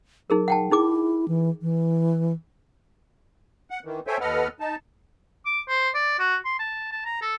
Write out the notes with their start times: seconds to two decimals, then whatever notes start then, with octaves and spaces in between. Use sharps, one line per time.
0.30 F#3 D#4 G#4 A#4
0.48 F#5 G5 A5
0.71 D#4 E4 G#4 D6
1.28 E3
1.61 E3
3.70 F#5
3.85 D#3 E3
4.07 A4 C5 C#5 E5 G5 G#5
4.21 D#2 A4 B4 D#5 F#5 F6
4.60 D#4 A5
5.45 D6
5.68 C5
5.95 D5
6.19 F#4
6.45 C6
6.59 A5
6.92 A5
7.05 A#5
7.21 A4